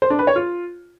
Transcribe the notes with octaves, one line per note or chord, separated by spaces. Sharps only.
C5
D4
B4
C#5
F4